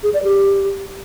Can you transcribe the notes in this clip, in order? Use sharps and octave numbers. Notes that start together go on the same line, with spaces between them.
G#4
D5
G4